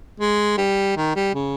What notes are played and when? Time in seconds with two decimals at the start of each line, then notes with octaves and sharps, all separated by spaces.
0.20 G#3
0.58 G3
0.97 D#3
1.15 G3
1.34 C#3